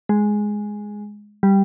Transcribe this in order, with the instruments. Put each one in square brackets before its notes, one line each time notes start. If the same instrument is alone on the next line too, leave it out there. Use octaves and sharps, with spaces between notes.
[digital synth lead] G#3
G3